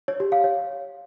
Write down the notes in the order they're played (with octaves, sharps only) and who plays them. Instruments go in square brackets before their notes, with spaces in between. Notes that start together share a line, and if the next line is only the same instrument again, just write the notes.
[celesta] C#5
G4
F5
C#5